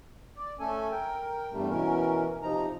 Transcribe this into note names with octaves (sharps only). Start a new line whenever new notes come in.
D5
A3 C#4 A4 G#5
A#4 G5
E2 G2 G3 A3
B2 E3 C#4 A#4
C3 F3 D#4 A#5